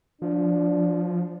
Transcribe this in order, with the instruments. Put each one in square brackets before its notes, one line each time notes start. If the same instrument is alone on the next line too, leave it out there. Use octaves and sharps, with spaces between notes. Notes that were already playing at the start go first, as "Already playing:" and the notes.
[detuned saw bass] F3 [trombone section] D4